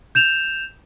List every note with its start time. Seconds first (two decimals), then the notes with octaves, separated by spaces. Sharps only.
0.15 G6 E7 F7